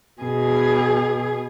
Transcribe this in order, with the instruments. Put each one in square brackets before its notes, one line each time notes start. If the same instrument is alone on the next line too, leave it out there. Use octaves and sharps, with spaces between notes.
[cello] B2 G#4